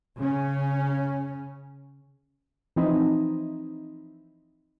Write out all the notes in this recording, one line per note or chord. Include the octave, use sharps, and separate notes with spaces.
C#3 C#4
E3 F3 C4 D#4 E4